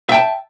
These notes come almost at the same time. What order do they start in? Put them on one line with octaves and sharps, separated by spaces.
E5 G5 A5